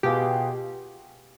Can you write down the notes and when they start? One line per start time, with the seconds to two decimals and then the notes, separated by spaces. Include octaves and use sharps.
0.03 B2 B3 F4 G4 G#4